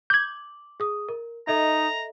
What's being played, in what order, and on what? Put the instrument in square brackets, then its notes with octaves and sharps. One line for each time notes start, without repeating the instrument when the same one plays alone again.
[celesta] D6 F#7 [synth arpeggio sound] G6 G#6
[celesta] G#4 D#6
A#4
[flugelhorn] D#4 [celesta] A4 D#5 E5 [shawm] A#5